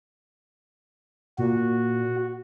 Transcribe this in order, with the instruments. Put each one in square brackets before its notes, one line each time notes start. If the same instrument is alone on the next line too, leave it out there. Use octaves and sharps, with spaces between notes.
[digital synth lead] A#2 [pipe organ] F#4